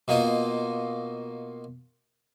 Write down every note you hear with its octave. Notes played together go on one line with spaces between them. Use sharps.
B2 A#3 D#4 F4